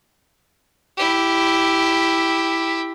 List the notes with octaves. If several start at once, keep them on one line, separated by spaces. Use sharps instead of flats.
E4 G4